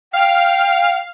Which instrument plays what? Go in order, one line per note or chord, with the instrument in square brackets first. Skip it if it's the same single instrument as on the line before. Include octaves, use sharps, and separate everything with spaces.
[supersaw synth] F5 [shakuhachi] G5